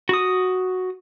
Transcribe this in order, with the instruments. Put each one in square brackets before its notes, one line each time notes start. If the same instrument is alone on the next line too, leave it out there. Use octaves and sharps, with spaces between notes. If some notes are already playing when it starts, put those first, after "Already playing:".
[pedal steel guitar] F#4 D#6